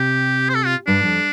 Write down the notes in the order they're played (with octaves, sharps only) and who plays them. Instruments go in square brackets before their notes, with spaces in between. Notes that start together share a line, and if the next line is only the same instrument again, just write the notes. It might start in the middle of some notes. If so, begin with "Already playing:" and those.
Already playing: [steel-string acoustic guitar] C3 [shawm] G4
[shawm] C5
A4
F4
[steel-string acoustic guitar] G2 [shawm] D4
[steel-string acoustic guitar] F2